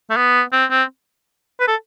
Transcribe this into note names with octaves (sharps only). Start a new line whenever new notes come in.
A3
B3
C4
C4
B4
A4